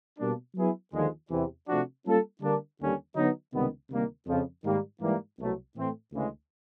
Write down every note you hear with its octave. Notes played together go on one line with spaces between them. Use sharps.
B2 G3 A#3 D4
F#3 B3 E4 G#4
D#2 D3 F3 G#3
E2 C3 E3
C3 F3 A3 D4 F#4
G3 A#3 C#4 F4 A4
D3 G3 A#3 D4
D#2 D3 G3 A#3 C#4
D3 F#3 B3 D#4
C#2 C3 D#3 G3 B3
D2 C3 D#3 G3 A#3
F2 C#3 F3
G#2 D#3 G3 A#3
G#2 E3 G3 A#3
C2 B2 F#3 A3
A2 E3 A3 C4
D2 C#3 E3 G#3